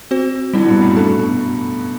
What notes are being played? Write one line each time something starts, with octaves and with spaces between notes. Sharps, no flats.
C4 F#4 C5
D3 F#3 G3 C4 E4
G2 B2
F#2 A2
G2 A3 D4 A4
B2